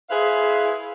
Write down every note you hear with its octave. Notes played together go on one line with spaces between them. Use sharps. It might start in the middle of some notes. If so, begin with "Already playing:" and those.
E4 G#4 B4 C5 E5 F5